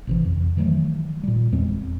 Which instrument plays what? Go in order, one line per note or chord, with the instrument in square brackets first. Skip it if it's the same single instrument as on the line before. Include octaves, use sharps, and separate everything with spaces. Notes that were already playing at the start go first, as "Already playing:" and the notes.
[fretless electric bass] G#1 C3 E3
F2
D#3 E3 F#3 A3
A#2 G3
E1 E2 G#3 C4